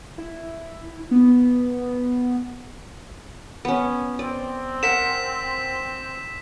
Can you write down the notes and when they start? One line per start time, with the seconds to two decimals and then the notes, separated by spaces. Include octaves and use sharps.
0.18 E4
1.11 B3
3.65 B3 C#4
4.19 C4 D5
4.83 A#4 E5 F#5 B6 E7